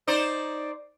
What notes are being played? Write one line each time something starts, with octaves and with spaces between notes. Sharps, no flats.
D#4 C5 D5